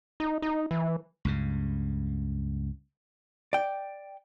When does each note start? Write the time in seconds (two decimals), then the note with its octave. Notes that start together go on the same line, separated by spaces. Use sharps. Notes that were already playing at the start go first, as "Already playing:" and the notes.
0.20 D#4
0.42 D#4
0.71 E3
1.25 C#2 G2 C#3
3.53 D5 G5